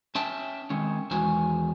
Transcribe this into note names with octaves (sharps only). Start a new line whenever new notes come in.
C#4 E5 G5 A5
D#3 G#3 C4 C#4
E2 D#3 G#3 F#4 G#5